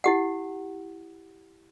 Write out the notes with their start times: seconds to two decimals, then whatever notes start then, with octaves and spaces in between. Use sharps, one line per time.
0.04 E4 G4 F#5